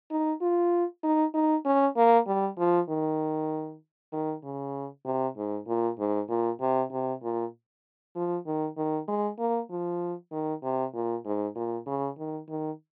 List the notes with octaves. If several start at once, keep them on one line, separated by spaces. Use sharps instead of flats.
D#4
F4
D#4
D#4
C#4
A#3
G3
F3
D#3
D#3
C#3
C3
G#2
A#2
G#2
A#2
C3
C3
A#2
F3
D#3
D#3
G#3
A#3
F3
D#3
C3
A#2
G#2
A#2
C#3
D#3
D#3